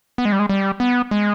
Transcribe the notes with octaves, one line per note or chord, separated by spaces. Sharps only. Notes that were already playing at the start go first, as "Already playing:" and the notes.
B3
G#3
G3
G#3
G3
B3
G#3